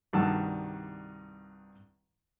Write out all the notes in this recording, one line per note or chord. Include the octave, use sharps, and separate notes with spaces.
C2 G2 D#3 F#4 A5 E6